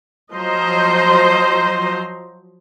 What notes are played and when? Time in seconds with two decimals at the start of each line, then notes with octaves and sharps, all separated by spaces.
0.34 F3 F#3 C5 D#5 A#5 C6